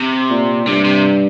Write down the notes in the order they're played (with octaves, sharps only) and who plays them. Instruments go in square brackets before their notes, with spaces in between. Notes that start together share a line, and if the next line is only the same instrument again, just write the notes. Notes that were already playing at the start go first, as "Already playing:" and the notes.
Already playing: [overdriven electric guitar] C3
[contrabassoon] A#2
[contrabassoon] G2 [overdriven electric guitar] C3
[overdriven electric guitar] C3